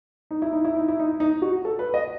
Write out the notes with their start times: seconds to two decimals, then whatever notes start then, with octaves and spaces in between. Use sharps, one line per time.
0.31 D#4
0.42 E4
0.53 D#4
0.65 E4
0.76 D#4
0.88 E4
0.99 D#4
1.20 D#4
1.42 F#4
1.65 A4
1.79 B4
1.94 D#5